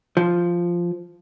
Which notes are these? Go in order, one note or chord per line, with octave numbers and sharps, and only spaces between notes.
F3